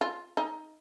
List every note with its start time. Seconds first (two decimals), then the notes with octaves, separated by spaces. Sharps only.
0.01 F4
0.37 D#4